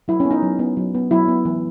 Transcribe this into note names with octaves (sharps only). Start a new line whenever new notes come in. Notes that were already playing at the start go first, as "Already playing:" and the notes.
F#3 E4
C#4
B3
D#4
F#3
B3
F#3
B3
F#3 E4
B3
E3